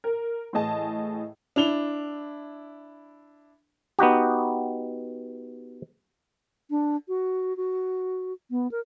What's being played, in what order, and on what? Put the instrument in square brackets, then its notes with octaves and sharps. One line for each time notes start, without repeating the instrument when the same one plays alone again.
[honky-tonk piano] A#4
A2 E3 G#4 D#5 A5
[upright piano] D4 E4 F7 G7
[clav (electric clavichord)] B3 D#4 F#4 G4
[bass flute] D4
F#4
F#4
B3
A#4